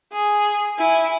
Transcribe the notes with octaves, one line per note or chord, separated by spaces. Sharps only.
G#4
E4 G#5